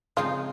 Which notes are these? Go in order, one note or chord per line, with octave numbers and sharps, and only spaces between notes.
C#3 F3 G#3 C4 D#4 F4